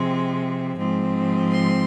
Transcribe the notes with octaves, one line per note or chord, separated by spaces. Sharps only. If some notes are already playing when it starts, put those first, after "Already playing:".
Already playing: C3 F3 G#3 C4
G#2 F3 C4
C6